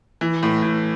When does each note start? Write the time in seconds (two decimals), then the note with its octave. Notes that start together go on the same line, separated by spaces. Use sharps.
0.21 E3
0.43 A2
0.62 A2